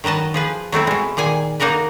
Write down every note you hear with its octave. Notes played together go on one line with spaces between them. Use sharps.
D#3 F#3 B4 D#5 A5
F3 G#4 B4
F#3 A3 C4 E4
B2 G#3
A#2 D#3 G#4 G#5
A#3 D#4 F#4 A#4 B4